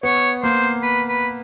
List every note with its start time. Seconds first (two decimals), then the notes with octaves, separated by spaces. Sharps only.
0.03 B3 C#5
0.43 A#3 C5
0.82 B4
1.09 B4